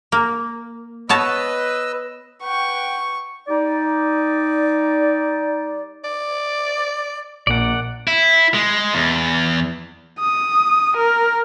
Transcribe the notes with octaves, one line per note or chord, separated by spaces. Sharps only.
A#3
B3 B4 C#5 D#5 A5 E6
B4 F#5 G5 C#6
G3 D#4 D5
D5
A#1 A#2 D5 F#5
E4
G#3
E2
D#6
A#4